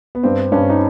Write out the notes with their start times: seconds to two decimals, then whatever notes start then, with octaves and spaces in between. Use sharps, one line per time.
0.15 B3
0.23 G2 C4
0.52 G2 C#4
0.70 D#4